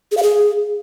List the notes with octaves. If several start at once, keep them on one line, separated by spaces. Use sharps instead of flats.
G#4
F5
G#4